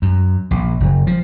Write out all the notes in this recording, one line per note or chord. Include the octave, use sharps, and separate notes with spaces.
F#2
A#1
F#1
F3